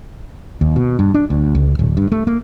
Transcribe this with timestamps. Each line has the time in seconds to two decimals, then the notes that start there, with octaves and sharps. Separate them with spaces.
0.61 D#2
0.76 B2
0.99 G2
1.14 D4
1.30 D2
1.55 C#2
1.79 D1
1.97 G2
2.12 A3
2.27 A#3